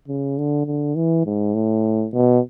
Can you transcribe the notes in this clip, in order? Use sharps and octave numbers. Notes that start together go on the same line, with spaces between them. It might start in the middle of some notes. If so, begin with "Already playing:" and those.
C#3
D3
D3
E3
G#2
A2
B2